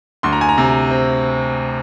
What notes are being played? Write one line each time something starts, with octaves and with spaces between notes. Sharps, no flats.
D2 C6
A#5
G#5
A#5
C3
C4